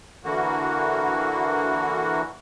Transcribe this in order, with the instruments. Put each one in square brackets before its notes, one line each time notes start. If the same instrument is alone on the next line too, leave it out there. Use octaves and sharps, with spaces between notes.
[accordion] D3 E3 A#3 F#4